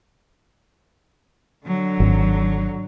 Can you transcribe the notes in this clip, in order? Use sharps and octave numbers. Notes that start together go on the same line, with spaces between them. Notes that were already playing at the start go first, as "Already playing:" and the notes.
D3 F#3
G#1